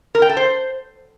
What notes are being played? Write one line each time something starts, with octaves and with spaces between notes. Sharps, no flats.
A#4
G5
A4
C5